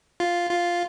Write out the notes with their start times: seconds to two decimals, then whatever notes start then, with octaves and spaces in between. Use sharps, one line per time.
0.20 F4
0.51 F4